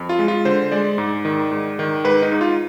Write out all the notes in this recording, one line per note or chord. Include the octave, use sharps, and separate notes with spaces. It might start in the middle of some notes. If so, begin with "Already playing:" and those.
Already playing: F2
F4
G#3
F4
D3 C5
G#3 D5
G#2
D#3
G#2
D#3
G#2 B4
D#4
G#2
F4